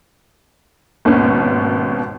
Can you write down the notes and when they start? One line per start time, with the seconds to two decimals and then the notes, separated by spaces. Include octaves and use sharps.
1.05 G#1 D#2 B2 C#4